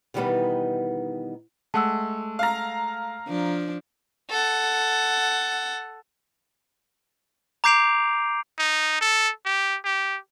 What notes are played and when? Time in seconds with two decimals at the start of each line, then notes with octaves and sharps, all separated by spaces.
0.14 B2 D#3 E3 G3 B3 D#4
1.74 G#3 A3 F#5 A5 E6
2.39 F5 A#5
3.28 F3 D4
4.30 A4 F#5
7.64 A#5 D6 G6 C7 D7 F7
8.58 D#4
9.01 A4
9.45 G4
9.85 G4